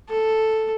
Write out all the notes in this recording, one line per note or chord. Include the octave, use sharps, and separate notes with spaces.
A4